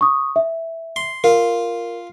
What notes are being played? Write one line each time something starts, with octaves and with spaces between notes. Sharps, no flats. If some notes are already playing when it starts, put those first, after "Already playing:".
C#6 D#6
E5
C6
F4 A#4